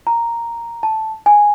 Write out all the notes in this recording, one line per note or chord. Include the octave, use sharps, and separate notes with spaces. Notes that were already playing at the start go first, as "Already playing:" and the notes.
A#5
A5
G#5